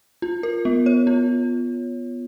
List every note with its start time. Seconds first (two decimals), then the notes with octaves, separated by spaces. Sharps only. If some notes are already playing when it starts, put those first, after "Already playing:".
0.22 F4
0.43 A#4
0.65 B3
0.86 C#5
1.07 F4